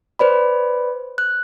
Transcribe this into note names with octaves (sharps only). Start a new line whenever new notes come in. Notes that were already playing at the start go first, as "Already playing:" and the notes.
B4 C5 D5 B5
F#6